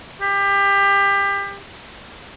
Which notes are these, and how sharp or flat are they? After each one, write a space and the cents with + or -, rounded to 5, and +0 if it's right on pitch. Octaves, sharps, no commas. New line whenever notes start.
G4 +25